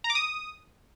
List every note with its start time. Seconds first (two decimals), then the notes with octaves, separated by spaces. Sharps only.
0.04 A#5
0.10 D6
0.15 D#6